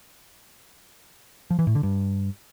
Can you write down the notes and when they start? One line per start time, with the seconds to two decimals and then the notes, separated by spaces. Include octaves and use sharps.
1.51 F3
1.59 E3
1.67 A2
1.75 D3
1.83 G2